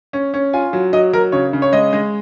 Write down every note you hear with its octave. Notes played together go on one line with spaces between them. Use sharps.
C#4
C#4
F4 G#5
F#3
F#3 D#5
F#3 A#4
C#3 C#5
C#3
C#5
G#3 D#5
G#3